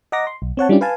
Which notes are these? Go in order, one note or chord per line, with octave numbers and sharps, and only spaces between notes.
D#5 F#5 A#5 D6 A#6
C6
B1
C4 C#5 F#5 A5
G3 C#4 D4 E4 F4 G4
B4 F5 G#5 A5